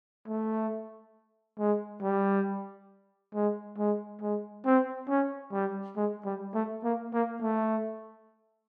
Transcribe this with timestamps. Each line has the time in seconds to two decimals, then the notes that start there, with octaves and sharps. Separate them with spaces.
0.28 A3
1.59 G#3
2.02 G3
3.34 G#3
3.78 G#3
4.21 G#3
4.65 C4
5.09 C#4
5.52 G3
5.96 G#3
6.25 G3
6.54 A3
6.84 A#3
7.13 A#3
7.42 A3